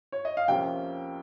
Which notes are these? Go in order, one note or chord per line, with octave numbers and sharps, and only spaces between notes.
C#5
D#5
F5
F2 C3 F3 A#3 C#4 G5